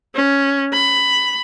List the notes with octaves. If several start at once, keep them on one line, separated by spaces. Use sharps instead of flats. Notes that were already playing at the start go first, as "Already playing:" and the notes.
C#4
B5